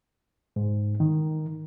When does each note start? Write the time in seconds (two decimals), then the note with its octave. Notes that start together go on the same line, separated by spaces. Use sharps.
0.56 G#2
1.00 D#3